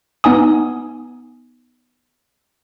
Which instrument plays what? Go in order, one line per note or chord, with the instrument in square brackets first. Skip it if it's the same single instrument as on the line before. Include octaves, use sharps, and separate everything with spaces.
[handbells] B3 D#4 G#5 D#6